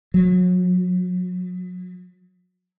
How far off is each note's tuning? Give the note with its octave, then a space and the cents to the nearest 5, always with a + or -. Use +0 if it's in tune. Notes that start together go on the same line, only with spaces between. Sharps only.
F#3 -35